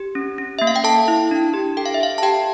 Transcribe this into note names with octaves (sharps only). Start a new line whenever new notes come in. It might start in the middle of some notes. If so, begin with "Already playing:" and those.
Already playing: G4
C#4
C#4
A#3 E5
F5
G5
A4 A5
E4
D4
G4
A4 G5
F5
E5
A4 F5
A5
G4 G5